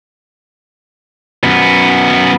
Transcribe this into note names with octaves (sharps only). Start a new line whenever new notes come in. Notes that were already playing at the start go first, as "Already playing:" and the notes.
F#2 B3